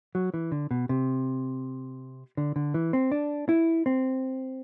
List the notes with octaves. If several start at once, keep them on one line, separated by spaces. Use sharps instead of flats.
F#3
E3
D3
B2
C3
D3
D3
E3
C4
D4
E4
C4